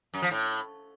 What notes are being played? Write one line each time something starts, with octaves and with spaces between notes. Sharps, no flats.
F#2
F3
A2